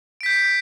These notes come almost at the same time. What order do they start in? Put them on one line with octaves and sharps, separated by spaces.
D7 B6 G6 C7